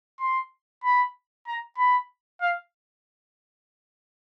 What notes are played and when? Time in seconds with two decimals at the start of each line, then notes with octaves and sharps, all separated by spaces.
0.20 C6
0.84 B5
1.47 A#5
1.78 B5
2.41 F5